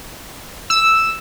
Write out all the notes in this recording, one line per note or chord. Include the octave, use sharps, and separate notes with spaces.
E6